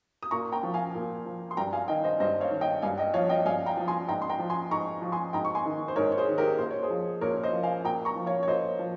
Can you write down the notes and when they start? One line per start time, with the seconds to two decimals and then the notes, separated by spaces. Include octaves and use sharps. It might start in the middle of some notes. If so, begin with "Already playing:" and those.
0.23 D#6
0.31 A#2 A#5 C#6
0.52 G5 A#5
0.63 F3
0.74 F5 G#5
0.95 A#2
1.26 F3
1.51 C6
1.57 G2 G5 A#5
1.73 F5 G#5
1.88 D#3 D#5 G5
2.04 C5 D#5
2.20 G2 C5 D#5
2.41 C#5 F5
2.51 D#3
2.61 D#5 G5
2.82 G2 F5 G#5
2.98 D#5 G5
3.14 F3 C#5 F5
3.29 D#5 G5
3.45 G2 F5 G#5
3.66 G5 A#5
3.77 F3
3.88 G#5 C6
4.08 G#2 G5 A#5
4.22 C6
4.29 G5 A#5
4.39 F3
4.50 G#5 C6
4.70 G#2 A#5 C#6
5.02 F3
5.12 G#5 C6
5.33 G#2 G5 A#5
5.45 C#6
5.55 G#5 C6
5.66 D#3
5.88 C5
5.96 G#2 A#4 C#5
6.12 C#5
6.18 G#4 C5
6.28 D#3
6.38 G4 A#4
6.59 A#2 C5
6.71 C#5
6.83 G#4 C5
6.90 F3
7.21 A#2 A#4 C#5
7.43 C5 D#5
7.53 F3
7.63 F5 G#5
7.85 A#2 G5 A#5
8.05 A#5 C#6
8.16 F3
8.26 C#5 F5
8.43 C#5
8.47 A#2 C5 D#5
8.79 F3